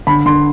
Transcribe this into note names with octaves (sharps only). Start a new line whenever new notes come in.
D3 B5
D3 C6